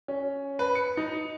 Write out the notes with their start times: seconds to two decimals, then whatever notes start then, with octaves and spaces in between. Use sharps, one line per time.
0.08 C#4
0.59 B4
0.75 C#7
0.97 D#4